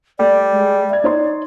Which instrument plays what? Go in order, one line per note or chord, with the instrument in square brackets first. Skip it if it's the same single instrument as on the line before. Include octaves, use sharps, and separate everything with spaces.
[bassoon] G3 [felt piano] A3 [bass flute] D5
[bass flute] G#3
[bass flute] D5 [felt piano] E5 G#6
[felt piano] D#4 C#5 C6